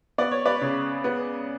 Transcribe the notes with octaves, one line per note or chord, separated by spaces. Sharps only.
B3 D5
C#5
B4 D5
C#3
B3